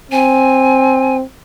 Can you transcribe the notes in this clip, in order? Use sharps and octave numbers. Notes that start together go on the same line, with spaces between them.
C4 G#5